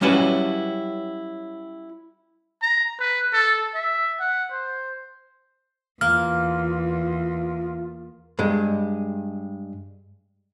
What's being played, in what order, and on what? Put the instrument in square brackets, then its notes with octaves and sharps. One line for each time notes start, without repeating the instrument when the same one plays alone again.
[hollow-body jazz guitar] F#3 G3 C#4 E4 F#4 B4
[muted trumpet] A#5
B4
A4
E5
F#5
C5
[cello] E2 [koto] A#3 [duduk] F4 [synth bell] F6
[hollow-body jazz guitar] G2 G#3